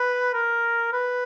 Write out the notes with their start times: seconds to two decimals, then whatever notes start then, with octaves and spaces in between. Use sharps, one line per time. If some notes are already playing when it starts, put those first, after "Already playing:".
Already playing: B4
0.33 A#4
0.92 B4